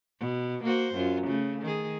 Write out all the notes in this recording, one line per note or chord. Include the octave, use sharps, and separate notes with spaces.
B2
A#3 F#4 C5
F#2 F4
C#3 A3
D#3 G#4